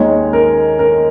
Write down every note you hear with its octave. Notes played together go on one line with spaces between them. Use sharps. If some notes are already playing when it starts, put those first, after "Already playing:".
Already playing: D#2 D#3 G#3 C#5
A#4
A#4